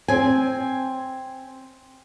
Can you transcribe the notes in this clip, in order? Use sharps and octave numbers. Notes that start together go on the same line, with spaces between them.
C4 G#5